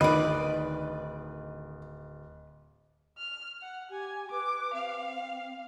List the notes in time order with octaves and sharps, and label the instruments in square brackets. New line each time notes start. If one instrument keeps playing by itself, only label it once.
[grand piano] D1 [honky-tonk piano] D#3 [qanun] B4 D5 [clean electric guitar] D#5
[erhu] F6
F#5
[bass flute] G4 [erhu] G#5
[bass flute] B4 [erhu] D6
[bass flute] C4 [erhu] F5